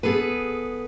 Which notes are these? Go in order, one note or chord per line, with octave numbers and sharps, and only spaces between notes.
B3 G#4 A4 B4